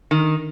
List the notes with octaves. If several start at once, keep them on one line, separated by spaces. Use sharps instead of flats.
D#3